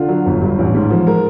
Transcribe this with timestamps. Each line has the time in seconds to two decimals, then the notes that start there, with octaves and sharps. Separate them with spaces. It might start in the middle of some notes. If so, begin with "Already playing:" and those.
Already playing: D3 F4
0.09 F#3
0.26 G1
0.41 G2
0.59 A1
0.75 G#2
0.90 F3
1.07 G#3 A#4